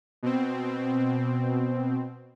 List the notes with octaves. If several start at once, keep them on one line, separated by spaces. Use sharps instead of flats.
B2 C4